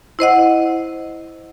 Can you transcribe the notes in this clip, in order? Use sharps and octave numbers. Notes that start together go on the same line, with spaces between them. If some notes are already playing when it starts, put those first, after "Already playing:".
E4 C5 D#5 F#5